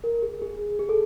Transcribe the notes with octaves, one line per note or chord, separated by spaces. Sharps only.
A#4
G#4
G#4
G#4
A4